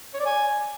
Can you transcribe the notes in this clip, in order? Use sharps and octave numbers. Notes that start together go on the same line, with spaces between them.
C#5
D5
G#5